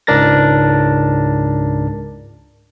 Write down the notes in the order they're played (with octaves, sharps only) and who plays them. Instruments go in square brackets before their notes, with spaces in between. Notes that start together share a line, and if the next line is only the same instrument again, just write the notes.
[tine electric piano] C#2 G#2 D4 A#4 A6 A#6